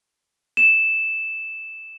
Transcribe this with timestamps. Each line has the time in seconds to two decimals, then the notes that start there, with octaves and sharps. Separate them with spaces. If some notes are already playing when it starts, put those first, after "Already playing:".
0.57 E7